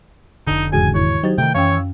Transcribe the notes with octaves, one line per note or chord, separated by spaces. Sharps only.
F1 D3 D#4
E2 G#2 C#3 F#4 G#4 G#5
D#3 E4 C#5 G#6
F#3 D#4 G4 C5 G#6 A6
C3 D#3 A3 G5
F#2 E3 C#4 C#5 F5 G5 E6